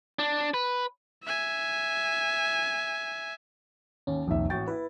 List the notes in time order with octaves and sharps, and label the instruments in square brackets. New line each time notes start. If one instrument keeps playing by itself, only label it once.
[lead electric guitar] D4
B4
[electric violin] E5 G#5
[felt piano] D#2 [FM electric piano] C#4
[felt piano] D#1 D#3 E5 [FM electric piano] C2 F2
[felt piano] A1 F#4 A6 [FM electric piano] G5
[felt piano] E4 [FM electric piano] B4